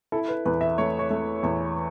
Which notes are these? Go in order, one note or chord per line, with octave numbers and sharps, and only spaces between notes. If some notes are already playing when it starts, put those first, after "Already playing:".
E4 A4
B4
E2 B4
E5
A3 C#5
C#5
A3
E2